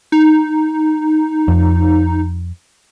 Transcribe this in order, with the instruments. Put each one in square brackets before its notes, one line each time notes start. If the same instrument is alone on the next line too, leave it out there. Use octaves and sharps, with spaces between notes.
[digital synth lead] D#4
[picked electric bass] F2